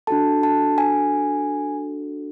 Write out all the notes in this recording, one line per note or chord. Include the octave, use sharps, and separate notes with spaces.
D4 F#4 A4 A5
A5
G#5